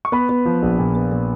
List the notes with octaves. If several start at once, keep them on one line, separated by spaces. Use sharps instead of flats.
C#6
B3 B4 B5
B3
F3
A#1
A#2
B3
A#2